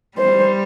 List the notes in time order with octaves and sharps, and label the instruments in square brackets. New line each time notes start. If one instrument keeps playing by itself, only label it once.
[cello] G3 [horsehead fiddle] C5